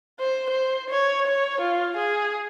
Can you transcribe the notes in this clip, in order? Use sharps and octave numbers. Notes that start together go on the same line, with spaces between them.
C5
C5
C#5
C#5
F4
G#4